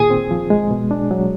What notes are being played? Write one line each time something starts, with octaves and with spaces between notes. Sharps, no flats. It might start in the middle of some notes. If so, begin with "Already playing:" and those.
Already playing: A#2 D#3 G#4
C4
F3
G#3
B2
D4
F#3